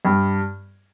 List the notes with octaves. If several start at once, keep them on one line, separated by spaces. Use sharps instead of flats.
G2